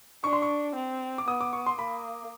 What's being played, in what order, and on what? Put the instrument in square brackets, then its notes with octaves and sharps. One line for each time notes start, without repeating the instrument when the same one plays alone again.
[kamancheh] D4 [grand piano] C#6
[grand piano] C6
C#6
[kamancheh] C4
[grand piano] D6
[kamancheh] B3 [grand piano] D#6
[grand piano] D6
C#6
C6
[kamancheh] A#3 [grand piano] B5